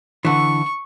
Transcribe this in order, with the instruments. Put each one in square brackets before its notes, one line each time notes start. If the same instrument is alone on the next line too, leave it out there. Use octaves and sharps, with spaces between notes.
[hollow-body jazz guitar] D3 E3 [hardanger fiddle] C#6